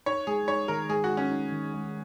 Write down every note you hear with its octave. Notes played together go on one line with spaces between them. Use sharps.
D#4 C#5
G#3 G#4
D#4 C#5
D#3 A#4
G#3 G#4
F#4
G#3
C#4
D#4
D#3
G#3